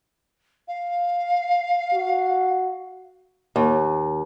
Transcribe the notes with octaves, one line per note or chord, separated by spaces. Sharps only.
F5
F#4
D#2